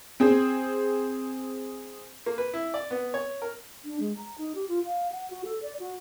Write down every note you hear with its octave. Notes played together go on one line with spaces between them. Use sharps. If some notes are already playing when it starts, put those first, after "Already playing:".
C4 G#4 C5
A#3
B4
E4
D5
B3
C#5
A#4
D4
G#3
A#5
D#4
G4
F4
F5
F#5
F#4
A4
D5
F#4